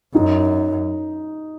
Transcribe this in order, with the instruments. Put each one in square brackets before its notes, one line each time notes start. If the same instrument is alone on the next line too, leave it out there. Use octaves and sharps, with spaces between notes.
[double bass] F#2 [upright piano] D#4